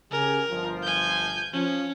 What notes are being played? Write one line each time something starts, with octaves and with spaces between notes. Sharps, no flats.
C#3 G4 A#4 G#5
G1 F3
G#5 G6
F3 C#4